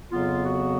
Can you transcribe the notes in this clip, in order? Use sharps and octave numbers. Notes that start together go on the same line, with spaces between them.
F2 C#3 F#3 B3 F4
F#4